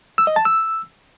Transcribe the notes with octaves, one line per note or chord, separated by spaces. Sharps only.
E6
D#5
A5
E6